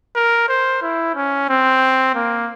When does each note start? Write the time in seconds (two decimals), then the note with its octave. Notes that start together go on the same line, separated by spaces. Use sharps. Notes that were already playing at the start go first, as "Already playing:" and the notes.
0.15 A#4
0.48 C5
0.82 E4
1.15 C#4
1.49 C4
2.15 A#3